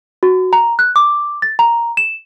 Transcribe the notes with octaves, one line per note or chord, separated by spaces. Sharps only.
F#4
A#5
F#6
D6
A6
A#5
E7